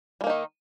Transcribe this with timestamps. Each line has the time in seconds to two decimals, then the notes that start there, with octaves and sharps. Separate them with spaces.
0.21 G3
0.24 A#3
0.27 D#4
0.30 D#3